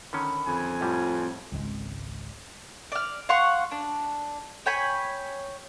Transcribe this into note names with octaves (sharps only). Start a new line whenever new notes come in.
D3 D#3 C#4 B5
F2 G#5
A2 G3 F4
G#1 C#2 G#3
D5 F6
F5 F#5 C6 C#6
D4
C#5 G5 G#5 B5